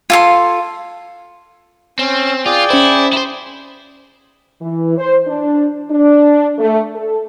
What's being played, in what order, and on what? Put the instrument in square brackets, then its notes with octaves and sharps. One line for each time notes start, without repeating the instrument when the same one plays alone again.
[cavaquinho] F4 A4 C6
[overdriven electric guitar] C4 [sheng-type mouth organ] C#4
[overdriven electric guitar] F4 [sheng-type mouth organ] G#4 D5 G5
[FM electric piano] C#4 C5 [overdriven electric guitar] E4
[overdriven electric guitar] E4 C5
[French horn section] E3
C5
D4
D4
A3
A4